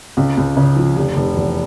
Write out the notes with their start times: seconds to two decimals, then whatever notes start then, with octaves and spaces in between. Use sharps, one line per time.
0.17 C#2
0.38 C#2
0.57 C#3
0.76 F3
0.96 F1
1.17 F1
1.37 E2